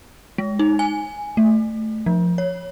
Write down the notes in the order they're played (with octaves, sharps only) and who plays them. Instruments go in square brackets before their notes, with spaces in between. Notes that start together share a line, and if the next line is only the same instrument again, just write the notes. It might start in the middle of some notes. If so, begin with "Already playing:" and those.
[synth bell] G#3
D#4
G#5
A3
F3
C#5